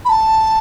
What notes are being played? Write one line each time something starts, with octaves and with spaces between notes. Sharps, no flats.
B5
A5